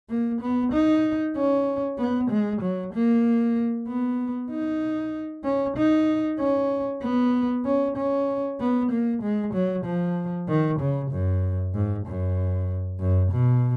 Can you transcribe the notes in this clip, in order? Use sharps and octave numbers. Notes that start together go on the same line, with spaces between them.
A#3
B3
D#4
C#4
B3
G#3
F#3
A#3
B3
D#4
C#4
D#4
C#4
B3
C#4
C#4
B3
A#3
G#3
F#3
F3
D#3
C#3
F#2
G#2
F#2
F#2
B2